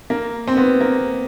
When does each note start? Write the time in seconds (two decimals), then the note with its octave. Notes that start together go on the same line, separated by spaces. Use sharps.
0.10 A#3
0.48 C4
0.57 B3
0.81 A#3